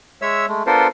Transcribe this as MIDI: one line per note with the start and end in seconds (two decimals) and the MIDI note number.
0.22 0.46 56
0.22 0.46 73
0.22 0.46 76
0.22 0.46 88
0.48 0.63 56
0.48 0.63 57
0.67 0.87 59
0.67 0.87 62
0.67 0.87 65
0.67 0.87 69
0.67 0.87 70
0.67 0.87 72